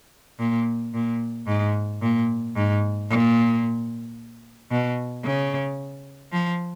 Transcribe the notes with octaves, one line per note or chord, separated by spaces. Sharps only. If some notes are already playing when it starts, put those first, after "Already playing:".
A#2
A#2
G#2
A#2
G#2
A#2
B2
C#3
F3